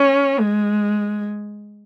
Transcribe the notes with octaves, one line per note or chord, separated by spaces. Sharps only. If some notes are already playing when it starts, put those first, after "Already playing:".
Already playing: C#4
G#3